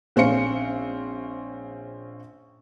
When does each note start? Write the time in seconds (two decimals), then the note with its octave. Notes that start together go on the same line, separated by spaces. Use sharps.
0.16 A#1 C4 C#4 F5 C#7